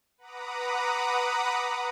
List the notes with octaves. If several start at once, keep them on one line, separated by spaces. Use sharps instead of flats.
B4 F#5 A#5 B5 D6 D#6